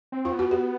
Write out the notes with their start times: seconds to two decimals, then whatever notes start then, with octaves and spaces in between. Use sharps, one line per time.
0.12 C4
0.25 F4
0.32 B3
0.39 F#4
0.51 G4